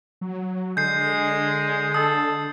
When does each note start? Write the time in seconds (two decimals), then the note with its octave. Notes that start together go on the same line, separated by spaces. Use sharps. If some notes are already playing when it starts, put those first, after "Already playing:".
0.21 F#3
0.77 D3 G#3 G6 C7
1.94 A4 D#6